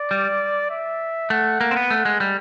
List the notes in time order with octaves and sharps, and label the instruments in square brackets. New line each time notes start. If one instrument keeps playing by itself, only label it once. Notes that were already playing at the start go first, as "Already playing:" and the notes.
Already playing: [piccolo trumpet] D5
[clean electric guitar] G3
[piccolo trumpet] E5
[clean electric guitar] A3 [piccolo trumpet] F#5
[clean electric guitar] A#3
C4
B3
A3
G#3
G3